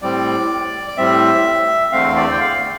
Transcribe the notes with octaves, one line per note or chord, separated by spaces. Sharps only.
A2 G3 C4 D5
D5
A2 G3 C4 E5
E2 D3 A3 C4 F5
D5
G5
F5